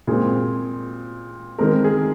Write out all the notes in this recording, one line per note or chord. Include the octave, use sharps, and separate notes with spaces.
A#2 G#3 C4 G#4
D#3 G#3 C4 A#4
G#4